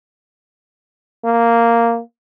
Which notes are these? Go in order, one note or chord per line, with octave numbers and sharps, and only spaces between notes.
A#3